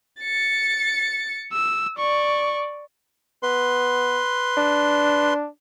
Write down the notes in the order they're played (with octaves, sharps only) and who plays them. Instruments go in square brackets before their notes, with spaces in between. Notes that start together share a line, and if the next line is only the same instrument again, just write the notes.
[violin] A6 C#7
[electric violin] E6
[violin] D5 [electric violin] C#6
[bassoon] B3 [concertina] B4 C6
[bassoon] D4